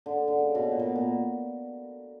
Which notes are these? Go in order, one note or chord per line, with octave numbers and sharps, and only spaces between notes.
D3
D3
C#3
B2
A#2
B2
A#2